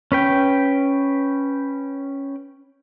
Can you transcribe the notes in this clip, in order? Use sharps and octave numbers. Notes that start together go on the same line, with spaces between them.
C#4 B4 G5